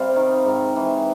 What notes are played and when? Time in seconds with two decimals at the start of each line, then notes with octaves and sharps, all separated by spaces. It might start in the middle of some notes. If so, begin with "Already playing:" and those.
Already playing: C3 G3 F5
0.16 D#3
0.46 G#2
0.76 E3